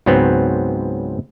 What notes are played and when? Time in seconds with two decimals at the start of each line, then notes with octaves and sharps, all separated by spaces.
0.06 C#2 G#2 F#3 B3 C4